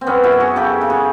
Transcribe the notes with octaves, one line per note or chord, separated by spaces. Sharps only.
C4
F#2 B3 C#4
E4 F#4
F#2
F#4 G#4
C#3 G4 A4
C#3
F#4 G#4